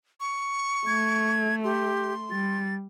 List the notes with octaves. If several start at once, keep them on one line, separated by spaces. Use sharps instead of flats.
C#6
A3 G#6
G4 C6
G3 A6